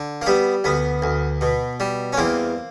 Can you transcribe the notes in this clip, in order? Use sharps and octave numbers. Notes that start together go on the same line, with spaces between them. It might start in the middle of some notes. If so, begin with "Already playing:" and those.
Already playing: D3
A#3
G3 B3
D2 B3
D2
B2
G3
C#4
E2 A#3 C4